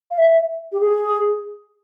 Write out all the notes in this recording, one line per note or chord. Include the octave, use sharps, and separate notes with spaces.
F5
E5
G4
G#4